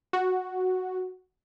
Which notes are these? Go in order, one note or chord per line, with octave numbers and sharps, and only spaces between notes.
F#4